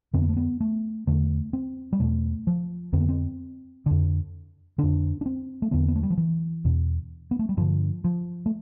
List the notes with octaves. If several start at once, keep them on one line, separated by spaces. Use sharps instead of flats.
F2 D3 C4
B3
A3
B3
A3
E2 D3 A3
C4
G3
E2 B2 A3
F3
F2 D3 C4
B3
C4
F2 D3
F2 D3 D4
D4
C4
A3
E2 D3 B3
B3
A3
G3
F3
E3
E2 B2
B3
A3
G3
G2 D3 F3
F3
A3